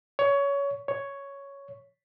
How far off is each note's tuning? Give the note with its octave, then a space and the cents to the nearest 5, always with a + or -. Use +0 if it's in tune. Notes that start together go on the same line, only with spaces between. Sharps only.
C#5 +20
C#5 +5